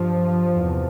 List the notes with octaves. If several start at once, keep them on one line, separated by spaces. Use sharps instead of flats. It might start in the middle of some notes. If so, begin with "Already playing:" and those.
Already playing: G2 F3
E2 C3